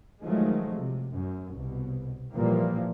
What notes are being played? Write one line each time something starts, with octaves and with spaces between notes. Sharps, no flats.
D#3 F3 F#3 G#3 A3
C3
F#2
C2 B2
A#2 E3 F3 G3 A#3